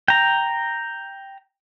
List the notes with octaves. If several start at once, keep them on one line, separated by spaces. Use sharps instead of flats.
G5 A#5